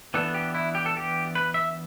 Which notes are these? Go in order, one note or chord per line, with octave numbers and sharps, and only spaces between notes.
E3 B3 D4 A4
G4
E4
G4
A4
G4
B4
E5